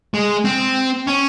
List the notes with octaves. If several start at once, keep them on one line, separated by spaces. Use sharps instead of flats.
G#3
C4
C#4